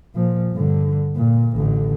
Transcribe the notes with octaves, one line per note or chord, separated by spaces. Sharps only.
A#2 F3
G2 D3
A#2
A1 D3